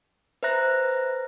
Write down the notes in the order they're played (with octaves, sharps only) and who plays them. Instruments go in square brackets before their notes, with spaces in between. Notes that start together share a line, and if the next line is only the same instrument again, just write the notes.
[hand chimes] B4 C5 E5 A#5 F#6 A#6